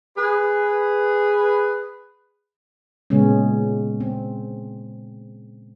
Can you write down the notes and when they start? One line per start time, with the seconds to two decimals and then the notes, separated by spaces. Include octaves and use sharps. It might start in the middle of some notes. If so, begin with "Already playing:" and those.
0.17 G#4 B4
3.10 A#2 C#3 G#3 B3 C#4
4.00 C4